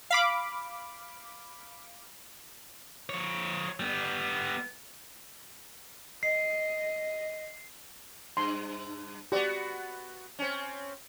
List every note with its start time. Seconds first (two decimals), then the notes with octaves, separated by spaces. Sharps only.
0.11 F5 B5 D6
3.09 F3 C#5
3.80 G3 B3
6.23 D#5 C7
8.37 G2 C6
9.32 B3 F#4 G4 D5
10.39 C4 C#4